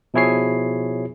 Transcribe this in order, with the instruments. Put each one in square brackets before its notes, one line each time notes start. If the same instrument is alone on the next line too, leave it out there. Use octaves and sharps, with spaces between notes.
[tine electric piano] B2 F3 E4 G#4 C#5 C7